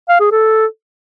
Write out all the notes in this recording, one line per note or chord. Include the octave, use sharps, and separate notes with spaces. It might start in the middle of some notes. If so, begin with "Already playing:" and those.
F5
G#4
A4